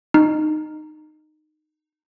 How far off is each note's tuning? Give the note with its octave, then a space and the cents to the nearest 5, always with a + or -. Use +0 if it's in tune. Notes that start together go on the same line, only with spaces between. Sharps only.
D#4 -15